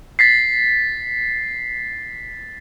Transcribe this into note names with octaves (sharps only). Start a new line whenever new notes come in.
A6 B6 C7